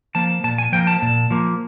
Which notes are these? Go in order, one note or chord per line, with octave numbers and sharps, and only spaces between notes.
F3 A#3 A5
A#2 A5
G#5
F3 A#3 G5
A5
A#2
F3 A#3